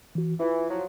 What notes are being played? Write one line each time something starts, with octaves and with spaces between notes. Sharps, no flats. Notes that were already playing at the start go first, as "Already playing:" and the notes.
E3 F#4
E3 E4 F4
F3 F#3